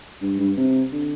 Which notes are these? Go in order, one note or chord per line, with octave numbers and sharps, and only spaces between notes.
G2
G2
C3
D3